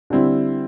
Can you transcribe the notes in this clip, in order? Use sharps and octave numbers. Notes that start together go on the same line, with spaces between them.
D3 G3 C4 E4